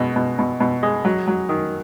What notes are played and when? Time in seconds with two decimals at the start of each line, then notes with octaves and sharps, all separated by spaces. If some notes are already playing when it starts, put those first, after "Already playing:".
Already playing: B2 G#3
0.16 B2
0.39 B2
0.60 B2
0.83 G#3
1.05 F#3
1.28 F#3
1.49 D#3